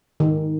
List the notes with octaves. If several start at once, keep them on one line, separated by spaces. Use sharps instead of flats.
D#3